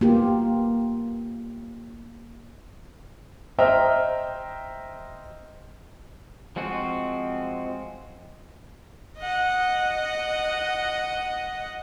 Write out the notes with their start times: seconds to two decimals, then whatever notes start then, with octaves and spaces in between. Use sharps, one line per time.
0.01 A#3 B3 F4 G4
3.58 C5 D#5 E5 G5 A#5 F6
6.56 F3 G#3 C4 F#4
9.19 D#5 F#5